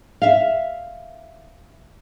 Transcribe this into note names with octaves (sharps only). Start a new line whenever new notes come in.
E5 F5